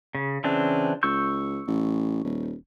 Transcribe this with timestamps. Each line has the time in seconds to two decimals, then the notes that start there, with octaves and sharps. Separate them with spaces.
0.15 C#3
0.44 C#3 E3 C4 D4
1.03 C#2 C#6 E6 G6
1.67 A1
2.24 D#1